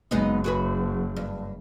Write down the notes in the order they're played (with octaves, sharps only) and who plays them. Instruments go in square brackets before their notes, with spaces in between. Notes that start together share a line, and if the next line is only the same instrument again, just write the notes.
[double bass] F#1 [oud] G#3 B3 D#4
[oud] F#4 G#4 B4
G2